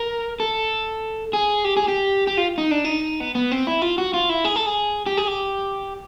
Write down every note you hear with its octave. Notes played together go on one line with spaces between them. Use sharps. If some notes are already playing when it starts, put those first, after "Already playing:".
Already playing: A#4
A4
G#4
G4
G#4
G4
G4
F4
D#4
D4
D#4
B3
B3
C4
E4
F4
F#4
F4
E4
G#4
A4
G#4
G4
G#4
G4